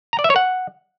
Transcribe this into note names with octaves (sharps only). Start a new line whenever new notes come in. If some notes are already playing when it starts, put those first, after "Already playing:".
A#5
D5
E5
C#5
F#5